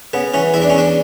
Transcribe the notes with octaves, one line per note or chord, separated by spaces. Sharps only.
C#3 B3
E3 C#4
E2 E4
D4
C#4
E2 D4